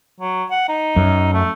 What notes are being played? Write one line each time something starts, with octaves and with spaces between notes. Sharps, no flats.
F#3
F#5
D#4
F#2
A3